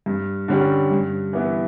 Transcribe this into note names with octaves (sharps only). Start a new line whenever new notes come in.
G2
D3 G3 C#4 G4
G2
E3 B3 E4